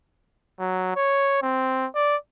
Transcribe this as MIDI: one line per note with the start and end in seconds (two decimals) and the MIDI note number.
0.59 0.92 54
0.96 1.40 73
1.42 1.87 60
1.95 2.16 74